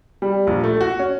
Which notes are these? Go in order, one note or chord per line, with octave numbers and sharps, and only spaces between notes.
G3
A#1
A3
F#4
C#4